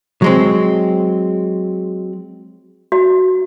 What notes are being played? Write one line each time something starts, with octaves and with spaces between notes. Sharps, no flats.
F#3 G#3 C4
F#4